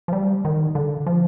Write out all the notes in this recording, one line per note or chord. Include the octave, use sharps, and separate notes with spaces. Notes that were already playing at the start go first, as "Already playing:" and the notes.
F3
G3
D#3
D3
F3